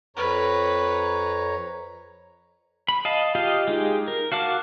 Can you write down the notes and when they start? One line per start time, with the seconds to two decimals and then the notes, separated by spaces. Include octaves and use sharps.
0.16 F2 B4 C#5 A#5
2.89 B5
3.05 D#5 F5 A5
3.35 F4 G4 D#5 F5
3.68 G#3 D#4 G4
4.08 A#4
4.32 F#4 F5 A5 D6